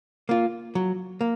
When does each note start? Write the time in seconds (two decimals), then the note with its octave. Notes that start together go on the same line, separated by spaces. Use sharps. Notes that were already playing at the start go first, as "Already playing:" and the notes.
0.29 A#3 F4
0.75 F#3
1.21 A#3